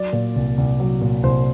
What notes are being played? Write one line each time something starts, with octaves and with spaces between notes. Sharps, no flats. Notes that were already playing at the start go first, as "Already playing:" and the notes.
Already playing: F#3 D5
A#2
C2
C2
F#3
A#2
C2 C5